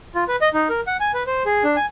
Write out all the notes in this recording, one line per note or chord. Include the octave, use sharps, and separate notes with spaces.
F4
B4
D#5
D#4
A#4
F#5
G#5
B4
C5
G#4
D4
G#5